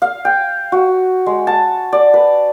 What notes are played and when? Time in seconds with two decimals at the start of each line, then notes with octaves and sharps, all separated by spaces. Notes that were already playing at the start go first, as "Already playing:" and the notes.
0.02 F5
0.25 G5
0.72 F#4
1.26 G#3
1.47 A5
1.93 D5
2.14 B4